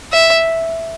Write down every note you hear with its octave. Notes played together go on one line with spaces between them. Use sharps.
E5